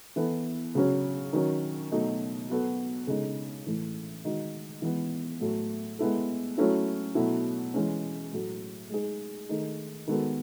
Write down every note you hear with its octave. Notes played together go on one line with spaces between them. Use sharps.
E3 B3 E4 A4
C#3 F#3 C#4
D#3 F#3 C#4
B2 F#3 A3 D#4
F#3 B3 F#4 A4
C#3 G#3 D#4 A4
A2 E3 A3
D#3 G#3 D#4 F#4
E3 G#3 B3
A2 F#3 A3
G#3 B3 E4 A4
F#3 A3 C#4 E4
B2 F#3 A3 E4
E3 G#3 C#4
A2 F#3 A3
G#3 D#4 G#4
D#3 A3 D#4 G#4
D#3 G#3 B3 F#4 A4